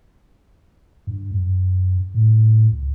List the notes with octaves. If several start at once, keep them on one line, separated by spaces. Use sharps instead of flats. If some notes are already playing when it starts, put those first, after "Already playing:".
G2
F#2
A2
C#2